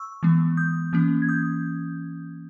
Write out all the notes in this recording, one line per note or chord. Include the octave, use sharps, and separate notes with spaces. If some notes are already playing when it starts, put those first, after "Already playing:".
Already playing: C#6 E6
E3 G#3 B3
D#6 G6
E3 A#3 C#4
G#6
D#6 G6